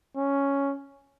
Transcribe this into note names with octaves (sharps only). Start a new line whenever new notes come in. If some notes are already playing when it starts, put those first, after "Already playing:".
C#4